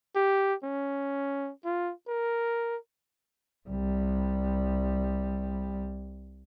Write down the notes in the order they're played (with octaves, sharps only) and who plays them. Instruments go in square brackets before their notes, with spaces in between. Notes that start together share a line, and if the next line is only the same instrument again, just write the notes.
[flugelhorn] G4
C#4
F4
A#4
[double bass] C2 G3